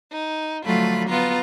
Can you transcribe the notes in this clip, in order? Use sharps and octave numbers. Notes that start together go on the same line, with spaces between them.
D#4
D3 F3 F#3 A3 F4 B5
B3 F4 A#5